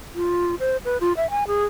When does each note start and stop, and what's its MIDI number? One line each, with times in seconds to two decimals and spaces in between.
0.15 0.55 65
0.60 0.77 72
0.85 0.97 71
1.01 1.13 65
1.17 1.30 76
1.30 1.46 80
1.47 1.65 68